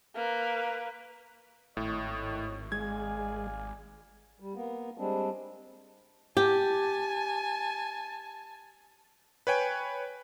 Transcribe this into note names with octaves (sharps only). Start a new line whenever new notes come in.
A#3 B4
G#1 A2 C#5 D#5
G#3 D5 F5 G#5 G#6
G3
A#3 B3
G3 G#3 C4 D4
G4 G#5 A5
B4 C#5 G5 G#5